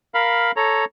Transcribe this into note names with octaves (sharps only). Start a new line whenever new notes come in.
A#4 F5 B5
A4 C#5 A#5